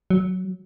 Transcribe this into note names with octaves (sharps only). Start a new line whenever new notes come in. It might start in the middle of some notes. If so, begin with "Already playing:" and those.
F#3